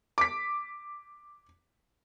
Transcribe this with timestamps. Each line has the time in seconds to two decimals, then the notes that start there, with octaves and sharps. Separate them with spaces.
0.18 D6 B6